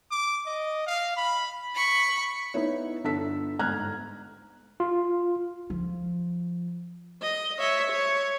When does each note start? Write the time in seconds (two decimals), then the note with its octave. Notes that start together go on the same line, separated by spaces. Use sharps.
0.11 D6
0.46 D#5
0.87 F5
1.17 B5
1.75 B5 C#6
2.54 B3 D#4 E4 C#5
3.04 G1 D3 A4 A5 E6 B6
3.59 G1 G#2 A#5 F6 F#6 G#6
4.80 F4
5.70 F3
7.22 D#5
7.59 C#5 E5
7.90 C#5